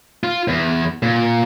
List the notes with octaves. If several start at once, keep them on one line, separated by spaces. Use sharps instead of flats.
F4
E2
A#2